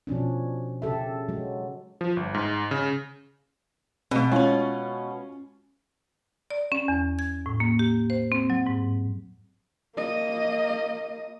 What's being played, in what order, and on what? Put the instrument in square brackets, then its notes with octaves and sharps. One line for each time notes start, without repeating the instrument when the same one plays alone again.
[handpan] B2 F3 C#4 D4
C#3 G4 A4 E5
F#3 G#3
[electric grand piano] F3
G1
G#2
C#3
[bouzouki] B2 [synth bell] A3 C4
[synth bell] G#3 C#5 [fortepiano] C#4 F4
[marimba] D5
C#4
E2
G#6
A2
A#3
G4
C5
C4
F#3
G#2
[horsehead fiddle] A#3 D#5